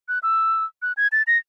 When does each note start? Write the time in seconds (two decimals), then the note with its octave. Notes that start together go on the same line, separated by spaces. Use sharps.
0.08 F#6
0.23 E6
0.82 F#6
0.97 G#6
1.12 A6
1.27 A#6